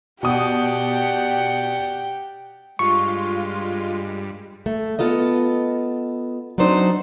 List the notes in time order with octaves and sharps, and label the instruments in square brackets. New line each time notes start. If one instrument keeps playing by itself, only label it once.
[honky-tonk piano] B2 D#6 [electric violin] G4 G5 [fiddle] D5 F#5
[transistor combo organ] G2 [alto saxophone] G#3 [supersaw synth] F4 [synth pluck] C#6
[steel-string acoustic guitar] A3
B3 F4 A4 D#5
F#3 C4 D4 D#4 C5